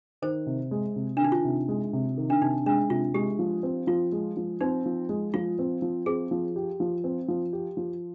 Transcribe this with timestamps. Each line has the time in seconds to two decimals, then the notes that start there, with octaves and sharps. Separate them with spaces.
0.22 D#3 C5
0.47 C3
0.71 G#3
0.96 C3
1.17 D4
1.20 D#3 D#4
1.32 F4
1.45 C3
1.68 G#3
1.93 C3
2.17 D#3
2.30 D4
2.41 C3 D#4
2.66 G#3 D4
2.90 C3 F4
3.14 G#3 G4
3.39 F3
3.63 C4
3.87 F3 F4
4.12 G#3
4.37 F3
4.61 C4 D#4
4.86 F3
5.09 G#3
5.34 F3 F4
5.59 C4
5.82 F3
6.06 C4 G#4
6.31 F3
6.56 G4
6.80 F3
7.04 C4
7.28 F3
7.53 G4
7.77 F3